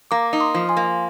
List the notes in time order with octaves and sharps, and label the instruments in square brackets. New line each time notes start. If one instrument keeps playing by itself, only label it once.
[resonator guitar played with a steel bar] A#3 [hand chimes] A#5 D6
[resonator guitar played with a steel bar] D#4
[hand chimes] C6 D#6
[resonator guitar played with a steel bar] F3
[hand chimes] G#5 C6
[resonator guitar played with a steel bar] A#3